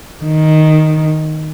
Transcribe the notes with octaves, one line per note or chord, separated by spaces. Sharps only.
D#3